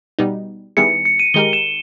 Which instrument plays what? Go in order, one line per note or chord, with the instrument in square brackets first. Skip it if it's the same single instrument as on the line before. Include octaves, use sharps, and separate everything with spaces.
[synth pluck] B2 G3 B3 D#4
[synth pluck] D#3 G3 B3 E4 G#4 [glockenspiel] C#7
[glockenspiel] C#7
D#7
[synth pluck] D#3 G#3 D#4 G4 A#4 [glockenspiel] G7
[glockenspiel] E7